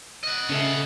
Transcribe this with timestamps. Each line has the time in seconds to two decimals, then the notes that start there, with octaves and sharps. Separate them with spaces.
0.23 D#5 F#5
0.50 C#3 C#4 A4 E5